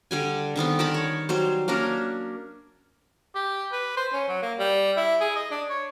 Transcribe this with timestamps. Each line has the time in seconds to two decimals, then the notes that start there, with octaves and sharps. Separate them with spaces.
0.11 D3 G3 G#5
0.56 D3 D#3 B3 C4
0.79 A#4 G5 A5 B5
0.94 C#5
1.29 F#3 G3 C5
1.68 A#3 C#4 D4 A#4
3.35 G4
3.72 B4
3.97 C5
4.13 C#4
4.29 F#3
4.42 A#3
4.59 G3
4.97 E4
5.21 G#4
5.36 D#5
5.51 D4
5.70 C#5